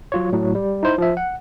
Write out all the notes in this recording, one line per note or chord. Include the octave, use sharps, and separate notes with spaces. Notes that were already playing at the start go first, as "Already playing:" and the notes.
F#3 F4 C#5
A2 F#3
G3
D#4 E4 C5
F3 E5
F#5